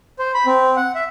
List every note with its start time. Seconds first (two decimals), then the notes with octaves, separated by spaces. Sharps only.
0.19 C5
0.34 B5
0.46 C4
0.76 F#5
0.95 E5